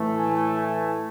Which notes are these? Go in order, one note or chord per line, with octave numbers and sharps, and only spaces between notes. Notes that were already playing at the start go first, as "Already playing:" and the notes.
Already playing: A2 E3 A3
G#5
G#5